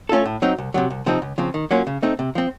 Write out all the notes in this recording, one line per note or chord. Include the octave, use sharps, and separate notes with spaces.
A3 C#4 F4 A4
A2
F#3 C4 D#4
C2
C3 D#3 F#3
C2
C3 F3 C4 D#4
C#2
C#3 F3 C4
D#3
F#3 A#3 C#4 F4
C#3
A3 C4 D#4
C3
F3 C4